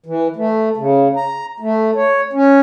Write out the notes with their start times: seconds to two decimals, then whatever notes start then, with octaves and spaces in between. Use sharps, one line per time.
0.06 E3
0.36 A3
0.77 C#3
1.16 A#5
1.60 A3
1.96 C#5
2.33 C#4